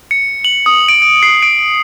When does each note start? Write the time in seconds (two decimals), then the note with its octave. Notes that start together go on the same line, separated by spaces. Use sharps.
0.11 C#7
0.45 F#7
0.66 D#6
0.88 D7
1.02 D7
1.23 C7
1.42 D7